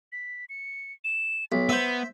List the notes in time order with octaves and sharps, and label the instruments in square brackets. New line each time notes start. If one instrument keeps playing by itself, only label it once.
[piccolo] B6
C#7
E7
[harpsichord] B1 [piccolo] B6
[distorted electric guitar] B3 [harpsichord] C5 E5